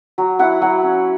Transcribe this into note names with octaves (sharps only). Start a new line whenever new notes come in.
F#3
E4 F#5
F#3 F#5
C#4